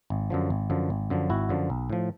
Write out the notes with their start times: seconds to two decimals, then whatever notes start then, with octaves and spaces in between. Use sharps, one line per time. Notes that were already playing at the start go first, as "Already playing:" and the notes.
0.10 G#1
0.30 F#2 D3 F3
0.50 G#1
0.70 F#2 D3 F3
0.90 G#1
1.10 F#2 D3 F3
1.30 G#1 E4 F#4
1.49 F#2 D3 F3
1.70 B1
1.90 A2 F3